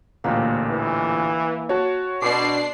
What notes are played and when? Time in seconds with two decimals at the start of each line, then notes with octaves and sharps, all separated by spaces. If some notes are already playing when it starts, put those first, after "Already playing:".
0.24 A1 D2 A#2 A#3 C4
0.70 E3
1.69 F#4 C#5 A5
2.22 B2 D4 C6 D6 C7